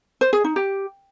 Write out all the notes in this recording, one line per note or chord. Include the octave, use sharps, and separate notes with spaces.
C5
G#4
D#4
G4